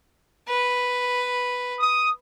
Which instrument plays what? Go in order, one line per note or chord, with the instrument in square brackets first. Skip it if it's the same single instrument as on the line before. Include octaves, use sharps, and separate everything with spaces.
[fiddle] B4
[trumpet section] D#6